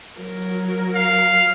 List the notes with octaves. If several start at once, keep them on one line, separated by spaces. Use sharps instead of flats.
F#3 A#4
F5